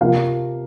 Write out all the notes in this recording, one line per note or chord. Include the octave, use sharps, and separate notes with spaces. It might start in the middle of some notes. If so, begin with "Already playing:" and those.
C3 F3 A#3 F5